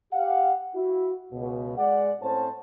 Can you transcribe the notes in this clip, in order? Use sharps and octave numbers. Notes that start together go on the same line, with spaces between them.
G4 F5 F#5
E4 F#4
C#2 B2
G#3 D5 F#5
A2 C4 C#4 C5 A5